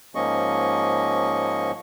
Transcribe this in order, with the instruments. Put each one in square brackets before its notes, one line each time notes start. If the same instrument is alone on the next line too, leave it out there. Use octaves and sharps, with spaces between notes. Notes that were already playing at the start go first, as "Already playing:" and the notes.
[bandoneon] G#2 F3 A#3 C#4 D#5 C#6